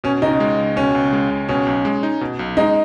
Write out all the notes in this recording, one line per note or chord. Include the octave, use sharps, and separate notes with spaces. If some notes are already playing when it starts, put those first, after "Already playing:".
B2 C#4
C#2 D#4
G#3
C#2
B2 C#4
C#2
G#3
C#2
B2 C#4
B1
G#3
D#4
B2
B1
G#3 D#4